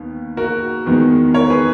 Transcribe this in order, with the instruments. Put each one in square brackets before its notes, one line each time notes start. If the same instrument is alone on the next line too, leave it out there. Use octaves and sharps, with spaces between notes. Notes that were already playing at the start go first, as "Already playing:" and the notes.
Already playing: [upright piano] D#2 D#3 B3
F#4 A#4
E2 D#3 G#3 B3
A#4 C#5
G#4 B4